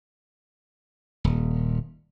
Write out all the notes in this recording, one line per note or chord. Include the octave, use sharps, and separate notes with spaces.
D#1